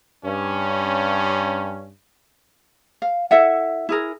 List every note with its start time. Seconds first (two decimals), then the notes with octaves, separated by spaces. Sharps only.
0.25 G2 C#4
3.02 F5
3.31 E4 A4 E5 F#5
3.89 E4 G#4 A#4